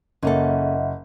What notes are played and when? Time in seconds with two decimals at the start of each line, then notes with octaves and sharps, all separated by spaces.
0.23 F#1 C#3 A#3 A4 D#5 E5 F#5